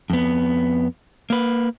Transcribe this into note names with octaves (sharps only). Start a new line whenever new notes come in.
F2 B3
A#3 B4